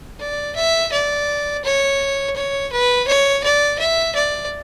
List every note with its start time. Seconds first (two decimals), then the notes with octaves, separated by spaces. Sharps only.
0.20 D5
0.56 E5
0.92 D5
1.64 C#5
2.36 C#5
2.72 B4
3.07 C#5
3.44 D5
3.79 E5
4.15 D5